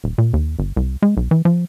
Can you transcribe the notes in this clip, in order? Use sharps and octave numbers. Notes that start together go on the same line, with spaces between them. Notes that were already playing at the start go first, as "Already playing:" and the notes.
D#1
A#2
D#2
G1
C2
G#3
B1
E3
F3